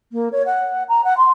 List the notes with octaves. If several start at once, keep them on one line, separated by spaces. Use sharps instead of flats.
A#3
C#5
F#5
A#5
F#5
C6